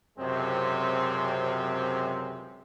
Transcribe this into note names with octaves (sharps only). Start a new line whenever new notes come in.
C#2 F#2 C3 G#3 C4